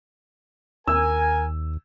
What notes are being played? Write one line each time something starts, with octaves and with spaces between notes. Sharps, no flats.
D#2 A#4 G#5 E6